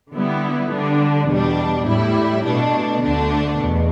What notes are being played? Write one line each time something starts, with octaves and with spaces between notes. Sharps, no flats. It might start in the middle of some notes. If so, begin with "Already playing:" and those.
D3 G3 B3 E4
D3 G3 D4
E2 B2 G3 D4
A2 G3 E4
B2 A3 D4
D2 D3 A3 D4
E2 B2